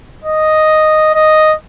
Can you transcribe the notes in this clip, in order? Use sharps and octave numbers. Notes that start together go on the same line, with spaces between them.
D#5
D#5